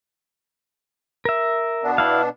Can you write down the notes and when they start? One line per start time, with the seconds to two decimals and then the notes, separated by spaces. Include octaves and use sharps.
1.25 A#4 E5
1.83 B2 B3 D4
1.98 E4 F5